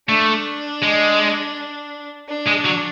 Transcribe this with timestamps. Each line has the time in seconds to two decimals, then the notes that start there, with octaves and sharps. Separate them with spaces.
0.09 A3 D4
0.82 G#3
2.29 D4
2.47 G#3
2.65 F#3